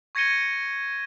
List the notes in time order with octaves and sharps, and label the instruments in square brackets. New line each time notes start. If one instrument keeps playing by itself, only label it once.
[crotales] C#6 G#6 A#6 C#7 D#7 G7